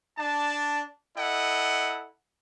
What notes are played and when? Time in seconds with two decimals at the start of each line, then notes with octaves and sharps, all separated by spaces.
0.18 D4 A5
1.17 E4 A4 D#5 F#5